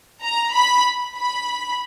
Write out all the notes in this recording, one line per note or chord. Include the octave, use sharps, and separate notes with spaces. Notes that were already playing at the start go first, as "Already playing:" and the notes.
A#5
B5
B5